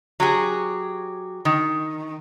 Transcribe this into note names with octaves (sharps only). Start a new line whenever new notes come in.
F#3 G4 G#4
D#3